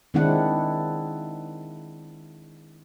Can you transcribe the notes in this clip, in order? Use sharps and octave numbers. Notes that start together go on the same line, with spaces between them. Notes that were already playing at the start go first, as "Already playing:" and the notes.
D#3 G#3 C4 D4 E4 F#5